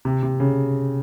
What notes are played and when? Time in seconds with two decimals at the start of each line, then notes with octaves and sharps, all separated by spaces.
0.05 C3
0.23 C3
0.40 C#3